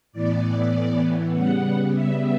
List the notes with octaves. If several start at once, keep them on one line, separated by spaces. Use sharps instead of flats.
A2 E3 B3 D5
C#3 G3 B3 F#5
E5